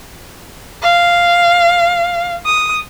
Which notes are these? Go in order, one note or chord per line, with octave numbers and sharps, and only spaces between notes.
F5
D#6